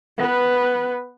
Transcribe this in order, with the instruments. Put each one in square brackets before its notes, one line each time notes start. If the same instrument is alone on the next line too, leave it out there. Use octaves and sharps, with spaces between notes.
[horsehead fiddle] B3 B4